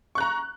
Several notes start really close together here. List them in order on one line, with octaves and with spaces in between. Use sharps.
C#6 F#6 A#5